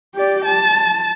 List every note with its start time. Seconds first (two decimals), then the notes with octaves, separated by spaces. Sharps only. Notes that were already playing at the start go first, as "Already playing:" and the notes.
0.15 G4 D5
0.45 A5